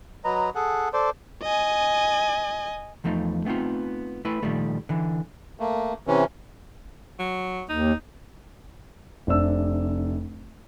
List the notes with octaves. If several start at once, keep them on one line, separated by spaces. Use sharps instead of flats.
F#3 B4 D#5 A#5
G#4 A4 F#5
A4 C5 D5
D#5 G#5
E2 F3 A3 D#4
A3 B3 C4 D#4 F4
A3 E4 B4
A#2 D3 D#3 F3 G3 A3
D3 E3
A3 A#3
C3 E3 C#4
F#3
D#2 D#4
F1 C3 D4 E6